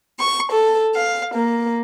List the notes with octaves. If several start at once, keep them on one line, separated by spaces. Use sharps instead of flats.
C#6
A4
F5
A#3